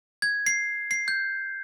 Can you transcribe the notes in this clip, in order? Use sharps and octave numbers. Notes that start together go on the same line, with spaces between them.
G#6
C7
C7
G6